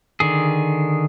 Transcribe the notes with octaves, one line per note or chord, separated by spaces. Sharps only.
D3 D#3 G#4